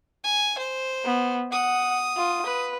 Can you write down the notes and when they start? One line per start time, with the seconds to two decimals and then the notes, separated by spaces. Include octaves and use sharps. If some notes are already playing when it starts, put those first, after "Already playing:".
0.24 G#5
0.58 C5
1.05 B3
1.52 F#5 D#6
2.16 F4
2.46 B4